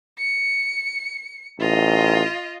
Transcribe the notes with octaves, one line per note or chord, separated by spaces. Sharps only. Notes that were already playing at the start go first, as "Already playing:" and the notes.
C#7
A1 F4 D#5